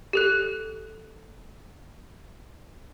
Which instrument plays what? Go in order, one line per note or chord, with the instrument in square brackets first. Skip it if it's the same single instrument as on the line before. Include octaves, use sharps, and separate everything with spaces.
[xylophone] G4 A4 F#6